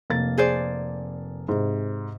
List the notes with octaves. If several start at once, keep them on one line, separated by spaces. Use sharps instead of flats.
F1 A#3 A6
G#4 C5 D5
G#2 C3